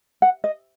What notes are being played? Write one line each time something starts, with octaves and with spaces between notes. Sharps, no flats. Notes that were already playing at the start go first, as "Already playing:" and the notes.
F#5
D#5